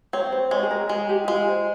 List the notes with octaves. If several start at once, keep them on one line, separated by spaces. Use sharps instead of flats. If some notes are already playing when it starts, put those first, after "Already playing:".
C4 C#5
C5
G#3 C#5
G#4
A#4
G#3 G#4
G4
E4
G#3 F4
C5